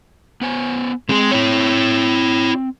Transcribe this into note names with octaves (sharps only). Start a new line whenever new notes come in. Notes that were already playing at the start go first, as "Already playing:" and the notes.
B3 C5 G#5
G#3 C4 G#4
E4 C#5